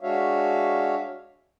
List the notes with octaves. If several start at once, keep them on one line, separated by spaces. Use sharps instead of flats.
G#3 D4 F#4 C#5 E5 F5